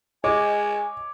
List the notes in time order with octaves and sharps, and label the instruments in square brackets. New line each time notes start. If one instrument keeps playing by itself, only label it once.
[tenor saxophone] G#3 [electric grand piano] C#5 D6 [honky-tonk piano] D#5 [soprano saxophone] G#5